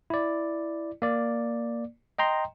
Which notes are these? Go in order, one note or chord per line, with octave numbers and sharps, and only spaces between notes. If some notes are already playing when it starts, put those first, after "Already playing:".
E4 D5
A#3 D5
D#5 G5 A#5 C6